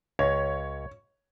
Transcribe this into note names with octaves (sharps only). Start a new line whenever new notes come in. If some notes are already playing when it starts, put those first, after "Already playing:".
C#2 C#5